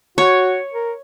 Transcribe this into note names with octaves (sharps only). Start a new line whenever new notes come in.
F#4 C#5
A#4